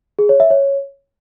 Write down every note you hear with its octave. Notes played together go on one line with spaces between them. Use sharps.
G#4
C#5
E5
C#5